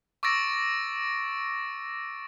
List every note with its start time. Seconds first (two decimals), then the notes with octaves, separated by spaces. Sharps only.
0.23 C#6 D6 E6 A6 A#6 D7